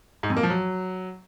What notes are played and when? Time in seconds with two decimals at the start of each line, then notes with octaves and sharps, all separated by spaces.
0.23 G#2
0.30 F2
0.37 A#3
0.43 F3
0.50 F#3